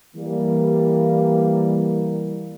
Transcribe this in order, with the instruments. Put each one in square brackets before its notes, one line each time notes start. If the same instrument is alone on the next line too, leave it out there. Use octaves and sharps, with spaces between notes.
[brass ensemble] E3 G3 A#3